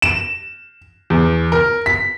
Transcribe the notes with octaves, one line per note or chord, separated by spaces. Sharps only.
E7
E2
A#4
B6